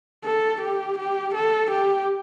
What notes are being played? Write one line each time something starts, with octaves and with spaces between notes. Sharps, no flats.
A4
G4
G4
A4
G4